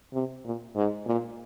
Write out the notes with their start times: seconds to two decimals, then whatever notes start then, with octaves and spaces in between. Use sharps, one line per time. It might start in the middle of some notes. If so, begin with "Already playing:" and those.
0.14 C3
0.45 A#2
0.76 G#2
1.06 A#2